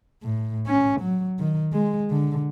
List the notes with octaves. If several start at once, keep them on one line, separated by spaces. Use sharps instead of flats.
A2
C#4
F#3
D#3
G#3
D3